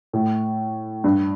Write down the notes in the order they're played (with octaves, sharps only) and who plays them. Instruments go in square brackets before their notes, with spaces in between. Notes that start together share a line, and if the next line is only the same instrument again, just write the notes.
[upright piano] A2
G2